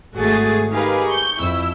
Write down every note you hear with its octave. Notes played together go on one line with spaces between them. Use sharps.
G#1 A3 F#4 G#4 G#5 A6
D#4 G4 G#4 A#4 B4 F5
C#6 G6
F2 E4 E6